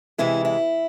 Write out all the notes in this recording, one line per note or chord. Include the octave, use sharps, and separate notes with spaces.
C3 E3 G#3 E4
E4